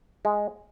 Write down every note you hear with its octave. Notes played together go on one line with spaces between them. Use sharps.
G#3